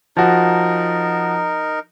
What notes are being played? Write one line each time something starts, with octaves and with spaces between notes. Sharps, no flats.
F3 D#4 F#4 A#4